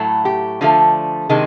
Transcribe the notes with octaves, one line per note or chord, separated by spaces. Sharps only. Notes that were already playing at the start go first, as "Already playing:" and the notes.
Already playing: A2 F#3 A3
G4
D3 F3 A3
C3 D#3 G#3